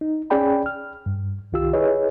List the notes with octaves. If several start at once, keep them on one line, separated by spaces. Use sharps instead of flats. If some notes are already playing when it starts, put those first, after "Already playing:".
D#4
C#4 G#4 D5 G5 B5
F6
G2
C2 D#3 F4 G4 E6
E4 G#4 B4 C#5 D#5